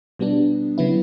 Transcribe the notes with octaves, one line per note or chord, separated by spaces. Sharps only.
B2 G3 B3 D4
C#3 F#3 B3 E4